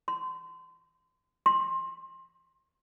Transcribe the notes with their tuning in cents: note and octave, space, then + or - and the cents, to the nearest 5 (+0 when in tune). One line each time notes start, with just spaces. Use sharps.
C6 -30
C6 +20